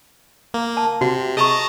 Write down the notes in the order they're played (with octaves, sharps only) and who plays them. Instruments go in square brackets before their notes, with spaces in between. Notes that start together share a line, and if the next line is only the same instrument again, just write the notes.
[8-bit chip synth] A#3
[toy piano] A5
[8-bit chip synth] C3 [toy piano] F#4
[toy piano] G#4 C#6 [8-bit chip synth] D#5 A5 A#5